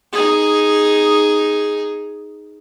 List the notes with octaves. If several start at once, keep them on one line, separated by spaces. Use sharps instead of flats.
D#4 G#4